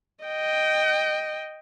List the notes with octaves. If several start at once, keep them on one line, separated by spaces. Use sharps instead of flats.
D#5 G5